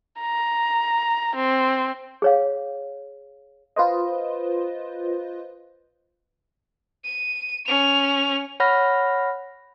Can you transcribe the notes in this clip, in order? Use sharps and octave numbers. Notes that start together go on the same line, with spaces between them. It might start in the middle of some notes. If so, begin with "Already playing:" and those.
A#5
C4
G#4 C#5 F5
F4 B4 C5 D#5
D#7
C#4 F7
C#5 F#5 B5 F6 A#6